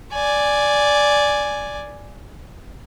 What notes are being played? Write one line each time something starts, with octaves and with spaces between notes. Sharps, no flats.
D5 G#5